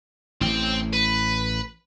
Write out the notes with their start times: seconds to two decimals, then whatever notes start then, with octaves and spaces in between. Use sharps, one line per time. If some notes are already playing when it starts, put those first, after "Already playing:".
0.41 A1 A2 C4 G5
0.93 B4